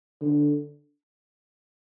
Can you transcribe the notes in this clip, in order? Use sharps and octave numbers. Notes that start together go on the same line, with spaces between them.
D3